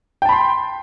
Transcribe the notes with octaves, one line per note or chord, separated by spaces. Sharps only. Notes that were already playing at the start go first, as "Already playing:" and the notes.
G5 A5 B5 C6